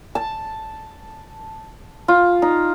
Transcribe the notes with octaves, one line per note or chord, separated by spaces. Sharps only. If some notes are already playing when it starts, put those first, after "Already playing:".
A5
F4
D#4